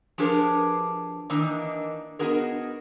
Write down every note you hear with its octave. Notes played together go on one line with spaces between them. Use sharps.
F3 D4 G4 G#4 A#4 B4
D#3 E3 A#3 D4 D#4
B3 D#4 F#4 G#4 A#4